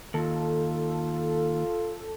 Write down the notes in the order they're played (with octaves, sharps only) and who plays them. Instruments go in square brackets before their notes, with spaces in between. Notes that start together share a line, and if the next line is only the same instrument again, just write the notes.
[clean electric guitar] D#2 [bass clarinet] F4 [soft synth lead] A4